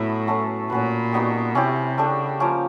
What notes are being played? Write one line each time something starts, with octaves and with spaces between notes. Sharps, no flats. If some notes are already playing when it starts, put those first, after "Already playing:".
Already playing: A2 F#3 A3 B3 C#4 E4
F#3 A3 C#4
A#2 C#4 F#4 B4
G3 B3 D#4 F#4
C3 C#4 E4 G4
C#3 A3 D4 G4
F3 A#3 C#4